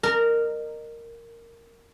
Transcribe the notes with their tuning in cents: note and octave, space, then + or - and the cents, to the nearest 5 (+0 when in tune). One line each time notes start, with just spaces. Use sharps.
A#4 -10 D#5 -30